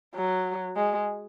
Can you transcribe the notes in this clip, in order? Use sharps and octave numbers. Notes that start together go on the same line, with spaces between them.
F#3
G#3